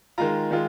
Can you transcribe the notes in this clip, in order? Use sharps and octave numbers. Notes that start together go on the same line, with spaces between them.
D#3 G#3 F4 A#5
D#3 G#3 F4